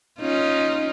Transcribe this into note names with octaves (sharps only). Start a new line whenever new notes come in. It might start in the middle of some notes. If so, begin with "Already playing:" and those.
C#4 D#4 F4